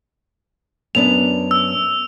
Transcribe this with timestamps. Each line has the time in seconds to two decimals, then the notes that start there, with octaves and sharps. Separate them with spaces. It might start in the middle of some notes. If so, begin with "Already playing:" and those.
0.95 F#2 B3 D4 F7
1.51 E6